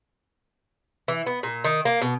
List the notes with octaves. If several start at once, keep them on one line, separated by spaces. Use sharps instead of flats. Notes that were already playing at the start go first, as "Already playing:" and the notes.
E3
B3
A#2
D#3
A#3
B2